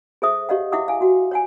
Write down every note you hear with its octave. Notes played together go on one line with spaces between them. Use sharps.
G#4 A4 C5 E5 D#6
G4 C#5 D#5 F5 F#5
E4 E5 F#5 D6 D#6
F5 G#5
F#4 F#5
C#5 F#5 G#5